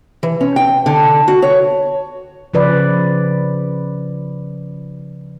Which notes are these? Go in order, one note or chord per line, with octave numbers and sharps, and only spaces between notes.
E3
C#4
G5
D3
F#4
C#5
C#3 F3 B4 D5